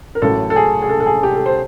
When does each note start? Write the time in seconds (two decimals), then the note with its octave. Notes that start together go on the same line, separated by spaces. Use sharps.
0.15 A#4
0.22 A1 A2 F#3 A4
0.50 A4
0.56 G#4
0.82 G#4
0.89 A4
1.00 A4
1.06 G#4
1.23 G4
1.35 A4
1.46 C5